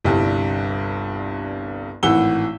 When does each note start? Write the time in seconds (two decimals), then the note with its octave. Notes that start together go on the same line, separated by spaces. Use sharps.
0.04 G1 C2 G2
2.03 G#1 A2 E3 F#5 E6 G7